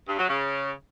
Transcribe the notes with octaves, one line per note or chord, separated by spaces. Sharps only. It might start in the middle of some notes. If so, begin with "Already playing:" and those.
G2
F#3
C#3